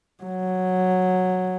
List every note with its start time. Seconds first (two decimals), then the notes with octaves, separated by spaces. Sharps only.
0.23 F#3